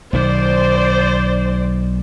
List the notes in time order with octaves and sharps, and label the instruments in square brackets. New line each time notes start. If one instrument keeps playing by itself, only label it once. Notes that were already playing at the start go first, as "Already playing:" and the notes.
[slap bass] B1 D#3 [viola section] C5 D5